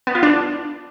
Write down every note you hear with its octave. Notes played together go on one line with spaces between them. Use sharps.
B3
F4
D4